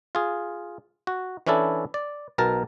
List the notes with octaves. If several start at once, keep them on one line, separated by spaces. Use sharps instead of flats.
F4 G#4
F#4
E3 C#4 D4 E4 A4
D5
B1 B2 A#4 A5